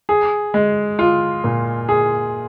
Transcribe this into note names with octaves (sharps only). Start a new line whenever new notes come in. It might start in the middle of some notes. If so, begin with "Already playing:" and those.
G#4
G#3
F4
A#2
G#4